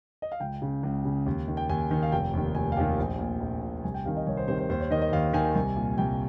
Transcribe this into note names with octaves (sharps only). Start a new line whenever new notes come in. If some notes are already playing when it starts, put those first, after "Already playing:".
D#5
F5
C#2 G5
C#3
C#2
C#3
D#2
D#3
G5
D#2 G#5
D#3
F5
F1 G5
D#2 D#3
F1 G#5
F5
D#2 D#3 G5
A#1
A#2
A#1
A#2
C2 G#5
G5
C3 D#3 F5
D#5
C2 C#5
C5
C3 D#3 C5
C5
D#2 C5
C#5
D#3 D#5
D#5
D#2 F5
D#3 G#5
C2
A#2
C2 G5